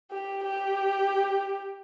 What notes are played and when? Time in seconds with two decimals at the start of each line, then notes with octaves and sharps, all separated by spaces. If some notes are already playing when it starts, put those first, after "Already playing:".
0.11 G4
0.44 G4